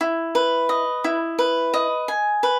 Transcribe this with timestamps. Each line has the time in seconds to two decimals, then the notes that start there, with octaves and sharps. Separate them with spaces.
0.01 E4
0.35 B4
0.69 D#5
1.04 E4
1.39 B4
1.74 D#5
2.08 G#5
2.43 B4